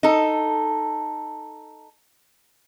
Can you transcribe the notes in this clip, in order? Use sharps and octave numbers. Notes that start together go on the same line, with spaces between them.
D#4 A4